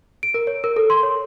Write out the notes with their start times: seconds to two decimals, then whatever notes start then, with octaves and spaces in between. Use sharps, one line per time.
0.23 D7
0.34 A#4
0.47 C#5
0.64 A#4
0.76 A4
0.90 C6
1.03 C#5